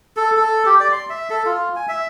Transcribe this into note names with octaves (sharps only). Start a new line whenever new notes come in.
A4
A4
G4
D5
C6
E5
A4
F4
G#5
E5